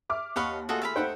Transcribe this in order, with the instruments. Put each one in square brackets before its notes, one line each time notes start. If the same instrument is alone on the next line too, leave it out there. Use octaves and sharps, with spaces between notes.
[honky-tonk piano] E5 D6 F6
[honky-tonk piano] D#2 [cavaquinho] C#5 D#5 F5 [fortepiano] F#5 B5 C#6
[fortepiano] A3 F4 G#4 [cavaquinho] F#4 A4 D#5
[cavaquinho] E5 F5 B5
[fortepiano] A3 F#5 G5 [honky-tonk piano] D#4 C5